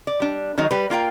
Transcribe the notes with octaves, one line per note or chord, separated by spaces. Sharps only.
D5
G3 D4
D#3 F#3 G#3 D#4
G3 B4
A#3 F4 A#4 G5